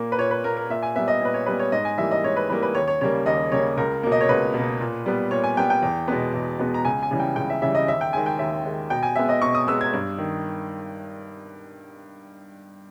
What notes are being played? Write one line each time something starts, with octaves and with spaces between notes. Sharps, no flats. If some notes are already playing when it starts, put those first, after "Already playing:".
Already playing: A#2 A#3
B4
A#2 C#5
B4
A#3 A#4
A#4
A#2 E5
G#5
G3 B3 E5
D#5
A#2 B4
C#5
G3 B3 B4
C#5
G#2 D#5
G#5
E3 G3 A#3 E5
D#5
G#2 C#5
B4
E3 G3 A#3 B4
B4
D#2 C#5
C#5
C#3 G3 A#3 C#5
D#2 D#5
C#3 G3 A#3 C#5
C#2 A#4
B2 A#3
D#5
C#5
C#2 B4
B2
A#3
A#2
G3 B3
A#2 C#5
G#5
G3 B3 G5
G5
E2
B2 G#3 B3
E2
B2 G#3 B3
A#5
C#2 G#5
G#5
C#3 E3 G3
G5
C#2 G5
E5
C#3 E3 G3 E5
D#5
D#2 E5
G5
D#3 G#3 G#5
G5
D#2 E5
D#3 G#3
B2 G5
G#5
G#3 B3 E5
D#5
B2 C#6
D#6
G#3 B3 E6
G#6
G2
D#3